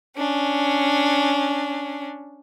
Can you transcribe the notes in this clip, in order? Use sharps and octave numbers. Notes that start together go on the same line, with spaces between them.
C#4 D4